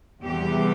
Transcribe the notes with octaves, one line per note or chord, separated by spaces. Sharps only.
E2 C3 E3 G3 G4